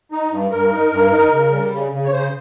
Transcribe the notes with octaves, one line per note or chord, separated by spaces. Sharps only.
D#4
G2
G2 A#4
D#4
G2
D#4
C#3
G3
C#3
C#3
C#5
C#3 C5